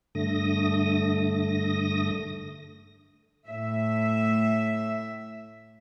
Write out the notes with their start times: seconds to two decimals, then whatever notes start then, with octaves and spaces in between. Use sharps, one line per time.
0.15 G2 D3 A3 D#6 A#6
3.47 A2 E5